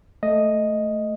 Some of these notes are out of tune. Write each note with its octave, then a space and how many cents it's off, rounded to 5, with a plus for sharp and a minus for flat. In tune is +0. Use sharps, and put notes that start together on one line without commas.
A3 +0 D#5 +0